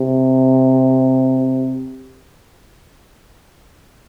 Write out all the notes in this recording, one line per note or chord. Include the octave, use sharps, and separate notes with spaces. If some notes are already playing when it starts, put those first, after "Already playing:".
Already playing: C3